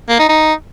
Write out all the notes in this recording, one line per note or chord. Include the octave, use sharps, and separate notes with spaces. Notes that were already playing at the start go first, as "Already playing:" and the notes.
A#3
D#4
D#4